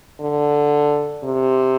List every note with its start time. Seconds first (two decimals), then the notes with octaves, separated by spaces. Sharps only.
0.21 D3
1.24 C3